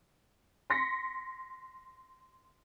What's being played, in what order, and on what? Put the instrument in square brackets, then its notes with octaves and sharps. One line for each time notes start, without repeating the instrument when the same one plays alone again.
[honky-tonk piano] C6 A#6 B6 C#7